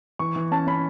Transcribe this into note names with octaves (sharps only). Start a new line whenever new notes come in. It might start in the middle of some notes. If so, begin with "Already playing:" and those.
E3 C#6
E3
C#4 A5
C#4 B5